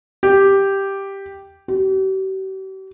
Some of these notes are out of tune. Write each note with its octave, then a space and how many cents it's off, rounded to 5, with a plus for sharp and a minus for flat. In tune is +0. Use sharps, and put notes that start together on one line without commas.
G4 +0
G4 -45